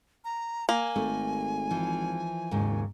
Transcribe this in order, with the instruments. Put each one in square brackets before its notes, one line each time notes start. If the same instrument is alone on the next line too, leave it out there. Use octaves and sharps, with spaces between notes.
[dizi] A#5
[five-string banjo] A#3 [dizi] G#5
[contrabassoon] G#1 [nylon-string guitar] A3
[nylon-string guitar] E3 F3
[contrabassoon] F#1 [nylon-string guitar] D#2 G#2 C#3